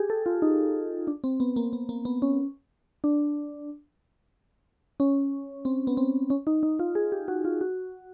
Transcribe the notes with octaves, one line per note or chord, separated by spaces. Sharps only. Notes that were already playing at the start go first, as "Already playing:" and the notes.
Already playing: G4 G#4
A4
F4
D#4
D4
C4
B3
A#3
B3
A#3
B3
C#4
D4
C#4
C4
B3
C4
C#4
D#4
D#4
F4
G#4
G4
F#4
F4
F#4